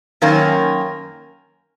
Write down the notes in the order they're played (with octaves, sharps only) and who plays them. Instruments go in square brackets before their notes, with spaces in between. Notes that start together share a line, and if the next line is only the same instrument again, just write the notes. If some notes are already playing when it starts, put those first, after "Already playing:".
[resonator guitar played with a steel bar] F#2 D#3 A#3 C#4